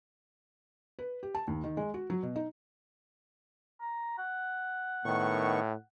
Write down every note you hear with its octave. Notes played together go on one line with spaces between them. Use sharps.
B4
G4
A5
D#2
D#3
G#3
F#4
F#3
B2
D#4
A#5
F#5
A2 D#3 B3 C#6